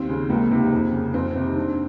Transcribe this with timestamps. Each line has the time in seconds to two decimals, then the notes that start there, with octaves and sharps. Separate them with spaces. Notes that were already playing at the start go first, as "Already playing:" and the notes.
Already playing: D#2 C4
0.09 C#3
0.30 C#2 A#3
0.51 C3 D#3
0.72 F2
0.93 C#3
1.13 F2 C4
1.35 C3 D#3
1.56 G2